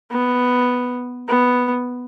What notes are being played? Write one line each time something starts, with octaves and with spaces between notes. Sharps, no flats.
B3
B3